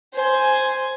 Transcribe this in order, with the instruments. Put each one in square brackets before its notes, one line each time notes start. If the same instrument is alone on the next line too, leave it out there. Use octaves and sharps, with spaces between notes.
[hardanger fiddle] C5 G#5